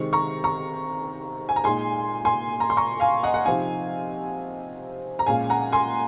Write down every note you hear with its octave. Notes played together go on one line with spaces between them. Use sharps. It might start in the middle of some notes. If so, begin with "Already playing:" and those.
Already playing: C3 D#3 G#3 C4 C#6
A#5 C#6
A#5 C#6
G#5
A#5
A#2 G#3 D#4 G#5 C6
G#5 C6
A#5
C6
A#5 C#6
F5 G#5
D#5 F#5
F#5
C3 F3 C4 D#4 F5 G#5
A#5
A#2 G#3 C#4 F5 G#5
F#5 A#5
G#5 C6